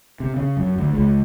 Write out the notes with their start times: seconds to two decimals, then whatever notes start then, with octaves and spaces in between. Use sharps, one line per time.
0.20 C3
0.36 C#3
0.57 F#2
0.78 D2
0.93 C#2